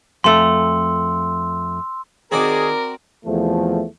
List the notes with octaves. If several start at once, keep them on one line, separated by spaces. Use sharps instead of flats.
F2 A3 C6 E6
D#3 C4 F#4 G#4 A#4 D5
E2 C3 F3 A3